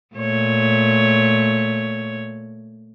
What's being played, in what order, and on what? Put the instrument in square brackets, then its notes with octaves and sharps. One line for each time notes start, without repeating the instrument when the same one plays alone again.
[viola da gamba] A#2 A3 C#5